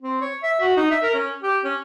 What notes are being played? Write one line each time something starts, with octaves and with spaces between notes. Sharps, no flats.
C4
C#5
E5
F#4
D#4
E5
A#4
C#4
G4
C#4